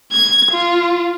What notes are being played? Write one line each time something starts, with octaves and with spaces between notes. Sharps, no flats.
G#6
F4